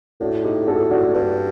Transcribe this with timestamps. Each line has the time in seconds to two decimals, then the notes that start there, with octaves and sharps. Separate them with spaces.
0.21 A2 D4 F#4
0.44 D#4 G4
0.67 F#4 A4
0.90 D4 F#4
1.14 G2 D4